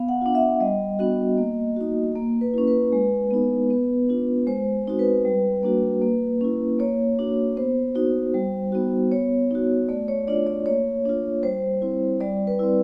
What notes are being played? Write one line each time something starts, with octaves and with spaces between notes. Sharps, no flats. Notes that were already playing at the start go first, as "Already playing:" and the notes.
Already playing: B3 F5
F#5
D4 F4
E5
G3 D#5
B3 D4 F#4
A#3
D#4 F#4
A#3
B4
C#4 E4
B4
G#3
B3 D#4
B3
D4 F4
G#3 C5
C4 D#4 F#4
B4
G3
A#3 D4 F#4
A#3
C#4 E4
A#3 C#5
D4 F#4
B3 C5
D#4 F#4
G3
B3 D#4 F#4
B3 C#5
D#4 F#4
A3 D5
C#5
D4 F4 D5
D5
A#3 C#5
D4 F4
G3 C5
C4 E4
G3 D5
B4
C4 E4